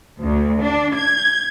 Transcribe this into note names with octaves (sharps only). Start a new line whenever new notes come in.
D2
D4
G#6